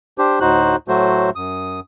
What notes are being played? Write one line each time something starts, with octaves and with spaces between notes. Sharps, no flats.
D4 G4 C5
D2 A2 D#4 F#4 C5 F#6
A2 F#3 A3 F#4 C5
F#2 D#6